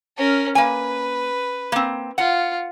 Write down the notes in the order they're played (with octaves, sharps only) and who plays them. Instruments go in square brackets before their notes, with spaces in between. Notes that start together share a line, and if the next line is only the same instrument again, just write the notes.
[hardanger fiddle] C#4 A#4
[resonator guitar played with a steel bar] A#3 G#5 [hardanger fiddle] B4
[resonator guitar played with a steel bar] A#3 C4
[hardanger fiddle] F4 [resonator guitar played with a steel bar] F#5